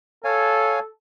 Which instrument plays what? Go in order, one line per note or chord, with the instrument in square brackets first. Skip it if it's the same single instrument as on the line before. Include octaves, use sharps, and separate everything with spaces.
[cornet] A4 [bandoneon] C#5 F5 G#5